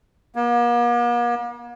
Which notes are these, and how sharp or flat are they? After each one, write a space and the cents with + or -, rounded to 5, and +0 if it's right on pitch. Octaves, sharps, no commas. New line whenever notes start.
A#3 +45